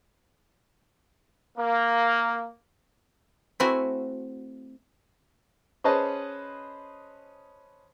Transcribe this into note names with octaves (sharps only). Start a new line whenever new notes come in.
A#3
A3 C4 E4 F#4 G#5
C#4 G#4 B4 C5 D#5 A5